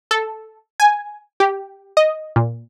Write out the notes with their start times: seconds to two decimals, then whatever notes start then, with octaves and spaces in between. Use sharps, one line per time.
0.11 A4
0.80 G#5
1.40 G4
1.97 D#5
2.36 A#2